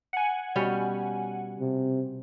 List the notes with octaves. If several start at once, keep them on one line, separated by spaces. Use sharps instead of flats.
F#5 G#5
B2 G3 C#4
C3